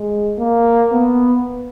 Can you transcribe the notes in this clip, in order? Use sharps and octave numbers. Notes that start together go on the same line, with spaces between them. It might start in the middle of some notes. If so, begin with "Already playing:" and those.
Already playing: G#3
A#3
B3